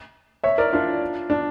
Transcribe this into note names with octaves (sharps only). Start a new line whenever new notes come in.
C#5 E5
A#4 D5
D4 F4
D4